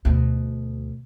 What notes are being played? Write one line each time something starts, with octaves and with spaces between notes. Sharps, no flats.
D2 B2